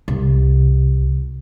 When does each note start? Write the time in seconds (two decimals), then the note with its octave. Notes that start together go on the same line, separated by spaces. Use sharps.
0.08 C2